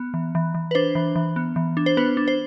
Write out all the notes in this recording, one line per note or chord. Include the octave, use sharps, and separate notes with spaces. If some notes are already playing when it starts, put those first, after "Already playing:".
Already playing: B3
E3
E3
E3
B4
D4 C5
E3
E3
B3
E3
D4
C5
B3 B4
D4
C5